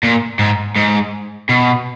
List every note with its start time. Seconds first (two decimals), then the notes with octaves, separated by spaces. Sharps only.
0.03 A#2
0.39 G#2
0.76 G#2
1.49 B2